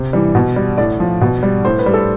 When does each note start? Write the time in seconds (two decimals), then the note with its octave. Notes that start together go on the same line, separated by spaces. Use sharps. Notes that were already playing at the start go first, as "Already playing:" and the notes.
Already playing: C3 C5
0.13 E3 G3
0.35 B2
0.56 G3
0.78 A2 D5
1.00 F3
1.21 B2
1.43 G3
1.65 A2 C5
1.79 B4
1.86 G3
1.94 A4